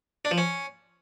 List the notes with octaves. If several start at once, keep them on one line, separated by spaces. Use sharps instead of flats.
D4
F3
C#4